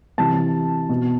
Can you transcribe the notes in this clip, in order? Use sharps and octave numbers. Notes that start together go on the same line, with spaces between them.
C3 E3 A5
B2